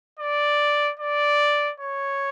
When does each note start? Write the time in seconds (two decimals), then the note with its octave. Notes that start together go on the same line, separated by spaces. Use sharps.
0.19 D5
0.99 D5
1.80 C#5